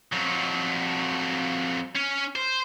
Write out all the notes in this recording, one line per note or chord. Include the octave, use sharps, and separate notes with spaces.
F2 F#3
C#4
C5